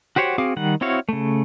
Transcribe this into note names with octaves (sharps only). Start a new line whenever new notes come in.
F#4 G4 C5 C#5 F#5
C4 F#4 G#4 F5 D6
D#3 G3 F#5
C4 E4 F#4 C#5 F5
C#3 A3